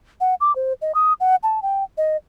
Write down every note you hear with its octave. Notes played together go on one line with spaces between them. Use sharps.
F#5
D6
C5
D#5
D#6
F#5
A5
G5
D#5